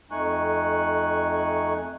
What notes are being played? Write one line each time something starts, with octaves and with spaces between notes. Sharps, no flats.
F2 A3 D#4 G#5 C#6 F#6